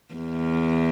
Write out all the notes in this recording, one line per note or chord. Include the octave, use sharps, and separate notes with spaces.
E2